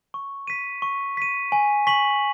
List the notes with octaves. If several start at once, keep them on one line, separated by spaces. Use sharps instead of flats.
C#6
B6 D#7
C#6
B6 D#7
G#5
C#6 B6 F#7